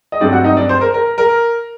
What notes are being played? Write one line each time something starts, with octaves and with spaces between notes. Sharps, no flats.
D#5
G2 F#3 A3 C4 D4 D5
F#4 F#5
D#4 D#5
D4 D5
C5
A#4
A#4
A#4